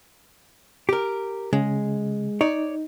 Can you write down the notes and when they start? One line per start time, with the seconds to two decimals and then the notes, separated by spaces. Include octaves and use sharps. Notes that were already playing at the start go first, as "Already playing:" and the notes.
0.89 G4 A#4
1.53 C#3 G#3
2.41 D#4 C#5 D5